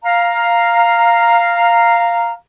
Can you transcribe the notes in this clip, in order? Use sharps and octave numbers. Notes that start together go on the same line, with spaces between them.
F5 A#5